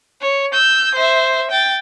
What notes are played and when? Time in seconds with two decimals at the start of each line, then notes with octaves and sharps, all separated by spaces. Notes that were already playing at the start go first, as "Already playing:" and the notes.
0.21 C#5
0.52 E6 G6
0.95 C5 E5
1.51 G5 A6